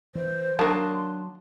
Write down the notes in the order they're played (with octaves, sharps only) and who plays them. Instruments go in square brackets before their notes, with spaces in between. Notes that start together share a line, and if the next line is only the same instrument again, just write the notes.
[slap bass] E3 [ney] C5
[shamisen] D#3 A#3 [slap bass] F#3 [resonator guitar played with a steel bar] D4 F#4 A5 [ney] C6